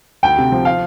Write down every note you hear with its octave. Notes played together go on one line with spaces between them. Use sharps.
D2 G5
C3
F3
F5